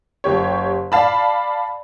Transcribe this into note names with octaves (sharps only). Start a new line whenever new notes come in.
F#1 G4 C#5
D5 F5 A5 B5